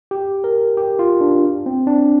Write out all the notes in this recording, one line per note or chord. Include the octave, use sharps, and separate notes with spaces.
G4
A#4
G4
F4
D4
C4
D4